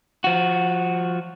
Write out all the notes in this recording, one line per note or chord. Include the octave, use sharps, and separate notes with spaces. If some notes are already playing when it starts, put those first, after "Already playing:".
F3 F#4